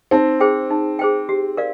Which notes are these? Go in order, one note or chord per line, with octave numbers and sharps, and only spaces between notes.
C4 D#4
G#4 C5 G5
D#4
G#4 C5 G5
G4
A#4 D5 F5